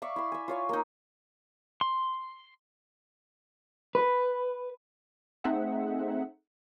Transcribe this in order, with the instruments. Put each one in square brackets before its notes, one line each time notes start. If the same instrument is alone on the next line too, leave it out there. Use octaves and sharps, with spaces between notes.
[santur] D5 E5 F5 C#6
E4 C6
E5 G#5
F4 C#5 F5
A#3 D#4
[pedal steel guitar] C6
[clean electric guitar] B4
[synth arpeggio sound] A3 C4 D#4 G#4 E5 F#5